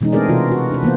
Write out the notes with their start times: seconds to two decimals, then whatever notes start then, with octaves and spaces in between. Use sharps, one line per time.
0.01 B2 E3 G#3 C#4 D#4
0.13 A3 C4 D4 G#4 A#4 D5
0.29 C3 E3 F4 F#4 A#4
0.51 F#4
0.70 D4 B4
0.83 E3 A#3 B3 C5